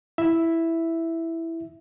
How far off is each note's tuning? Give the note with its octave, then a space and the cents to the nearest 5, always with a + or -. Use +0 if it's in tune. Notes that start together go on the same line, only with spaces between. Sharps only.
E4 +0 E5 +0